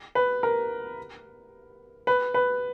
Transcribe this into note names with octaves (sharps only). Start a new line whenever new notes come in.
B4
A#4
B4
B4